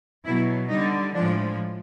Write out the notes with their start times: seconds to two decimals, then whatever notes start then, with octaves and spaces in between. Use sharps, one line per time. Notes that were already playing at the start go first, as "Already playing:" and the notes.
0.25 B2 F#3 E4
0.69 D3 G3 D#4
1.14 A2 F3 G#3 D4